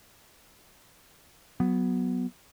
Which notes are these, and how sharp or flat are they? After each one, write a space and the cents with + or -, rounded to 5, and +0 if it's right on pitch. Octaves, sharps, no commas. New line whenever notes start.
F#3 +0 B3 +0